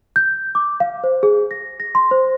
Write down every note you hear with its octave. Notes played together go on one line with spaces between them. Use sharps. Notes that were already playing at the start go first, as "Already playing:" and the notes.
G6
D6
F5
C5
G#4
A#6
A#6
C6
C5